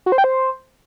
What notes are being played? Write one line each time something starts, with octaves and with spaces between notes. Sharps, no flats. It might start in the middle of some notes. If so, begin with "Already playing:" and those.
F#4
C5
G5
C5